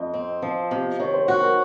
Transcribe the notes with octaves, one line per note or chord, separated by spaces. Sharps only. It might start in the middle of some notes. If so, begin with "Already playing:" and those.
Already playing: F2 D#5
C4
F3
C3
D#3 C#5
C5
F#4
A#4